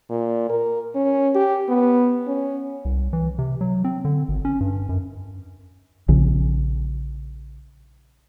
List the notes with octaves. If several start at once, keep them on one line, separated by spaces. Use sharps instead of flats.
A#2
A#4
C#4
G4
B3
C#4
C2
E3
C3
F#3
C4
D3
G#1
C#4
G2
F#2
A#1 C#3